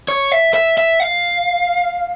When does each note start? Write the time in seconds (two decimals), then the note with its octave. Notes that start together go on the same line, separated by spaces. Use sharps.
0.08 C#5
0.32 E5
0.54 E5
0.78 E5
1.00 F5